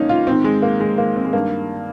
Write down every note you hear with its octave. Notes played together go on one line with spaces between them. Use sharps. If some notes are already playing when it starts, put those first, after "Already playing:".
Already playing: F2 C#3 G#3 A#3 C#4 D#4
F4
G#2 D#3 C4
G#3
A#3
G#3
A#3
C4
G#3
G2 D#3 A#3